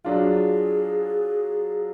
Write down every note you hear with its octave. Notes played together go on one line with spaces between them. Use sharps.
F#3 D4 F4 G#4